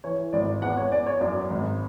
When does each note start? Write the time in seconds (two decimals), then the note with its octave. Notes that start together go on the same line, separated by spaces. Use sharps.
0.04 E3 C#5
0.33 G#1 D5
0.62 E2 F#5
0.77 C#5
0.92 E2 D5
1.07 C#5
1.21 F#2 D5
1.51 G#1